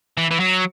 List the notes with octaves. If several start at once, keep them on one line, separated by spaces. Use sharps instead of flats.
E3
E3
F#3